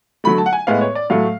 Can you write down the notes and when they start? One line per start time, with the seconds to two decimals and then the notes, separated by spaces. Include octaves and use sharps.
0.24 D3 F#3 A3 B5
0.38 A5
0.46 F#5
0.53 G#5
0.67 A2 G#3 B3 F5
0.81 C#5
0.95 D5
1.10 A2 F#3 A3 F5